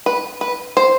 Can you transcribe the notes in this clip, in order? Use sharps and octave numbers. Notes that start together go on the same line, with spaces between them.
B4
B4
C5